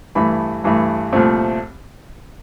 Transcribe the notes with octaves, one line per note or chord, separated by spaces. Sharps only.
G2 E3 A3 B5
G2 E3 A3
C2 A#2 F3 A3 C4